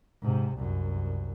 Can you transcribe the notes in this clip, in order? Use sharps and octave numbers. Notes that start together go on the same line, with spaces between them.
G#2 C3
C2 F#2